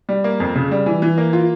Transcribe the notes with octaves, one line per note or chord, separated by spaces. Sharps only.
G3
A#3
F2
C#3
G3
E3
E3
A#3
F4